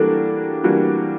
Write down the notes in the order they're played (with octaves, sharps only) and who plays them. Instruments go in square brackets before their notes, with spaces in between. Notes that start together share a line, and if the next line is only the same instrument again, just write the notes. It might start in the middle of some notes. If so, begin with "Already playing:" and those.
Already playing: [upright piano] E3 G3 A#3 D4 F#4 [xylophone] A4
[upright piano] E3 G3 A#3 D4 F#4